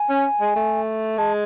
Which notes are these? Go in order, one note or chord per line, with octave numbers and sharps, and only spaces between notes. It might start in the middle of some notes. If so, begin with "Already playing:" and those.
Already playing: G#5
C#4
G#3
A3
G#3 A5